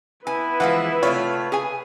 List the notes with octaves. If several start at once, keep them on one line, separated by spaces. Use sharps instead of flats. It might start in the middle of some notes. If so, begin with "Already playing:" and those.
B3 E4 B4 G#5
E3 F3 G#3 F5 F#5
C3 A3 F4 C#5
G#4 G#5